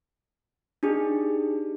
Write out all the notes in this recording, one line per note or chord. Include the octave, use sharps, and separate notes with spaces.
D4 D#4 G4 G#4